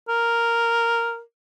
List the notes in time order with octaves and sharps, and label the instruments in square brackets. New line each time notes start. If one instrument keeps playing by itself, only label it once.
[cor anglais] A#4